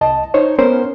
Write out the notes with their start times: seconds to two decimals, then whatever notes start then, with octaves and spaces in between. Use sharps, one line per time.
0.01 C2 D#5 A5
0.34 D#4 C5 C#5
0.58 B3 C#4 A#4 C5